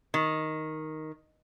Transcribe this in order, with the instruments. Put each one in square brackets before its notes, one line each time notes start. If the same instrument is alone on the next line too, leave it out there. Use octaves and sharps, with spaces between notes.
[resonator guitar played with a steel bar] D#3